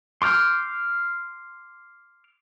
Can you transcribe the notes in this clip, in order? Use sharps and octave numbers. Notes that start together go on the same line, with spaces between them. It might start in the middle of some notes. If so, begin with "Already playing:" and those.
C6 D6 F6 G6